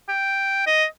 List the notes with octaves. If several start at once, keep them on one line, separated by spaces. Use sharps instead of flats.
G5
D#5